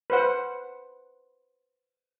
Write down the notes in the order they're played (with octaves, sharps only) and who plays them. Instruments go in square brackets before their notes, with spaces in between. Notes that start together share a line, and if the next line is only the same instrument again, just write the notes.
[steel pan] B4 C5 F#5